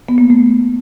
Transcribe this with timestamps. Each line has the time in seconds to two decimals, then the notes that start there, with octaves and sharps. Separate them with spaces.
0.09 B3
0.18 A#3
0.30 A3